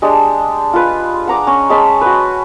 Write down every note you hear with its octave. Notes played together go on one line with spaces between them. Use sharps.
G#3 D4 G4
F4 B4
F#5 A#5 D6
C#4
G#3 C#4 A5 B5
F#4 B4